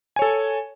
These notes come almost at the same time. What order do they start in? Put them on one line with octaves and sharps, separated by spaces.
G#5 C#5 A4